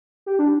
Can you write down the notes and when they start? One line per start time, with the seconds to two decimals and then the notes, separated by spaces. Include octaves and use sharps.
0.26 G4
0.39 D4